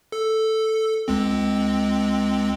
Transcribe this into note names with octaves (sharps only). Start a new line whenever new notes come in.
A4
C#2 G#3 C4